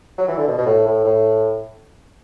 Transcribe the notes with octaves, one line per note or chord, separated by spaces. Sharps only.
F#3
E3
D3
B2
B2
A2
A2
A2